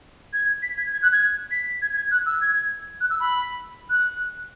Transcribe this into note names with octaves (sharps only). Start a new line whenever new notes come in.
G#6
B6
G#6
G#6
F#6
G#6
B6
G#6
G#6
F#6
E6
G#6
F#6
E6
B5
F#6